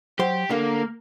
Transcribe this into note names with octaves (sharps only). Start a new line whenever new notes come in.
F#3 G4 C5 C6
D3 A#3 F5